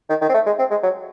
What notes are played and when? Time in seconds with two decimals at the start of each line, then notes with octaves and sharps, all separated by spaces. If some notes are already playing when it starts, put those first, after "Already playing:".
0.09 D#3
0.21 D#3
0.29 C4
0.34 A3
0.46 G#3
0.59 C4
0.70 G#3
0.83 F#3